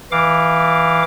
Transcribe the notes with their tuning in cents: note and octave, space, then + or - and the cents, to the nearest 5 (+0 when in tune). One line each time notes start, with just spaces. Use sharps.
E3 -5 F5 +0 D6 +0